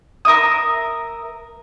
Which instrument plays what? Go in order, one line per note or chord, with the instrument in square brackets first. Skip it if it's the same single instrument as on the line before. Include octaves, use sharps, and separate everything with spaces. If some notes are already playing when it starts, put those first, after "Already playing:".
[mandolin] A#4 E5 D#6